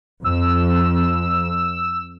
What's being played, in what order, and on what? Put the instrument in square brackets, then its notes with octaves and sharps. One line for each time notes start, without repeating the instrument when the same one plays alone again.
[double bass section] F2 [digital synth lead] E6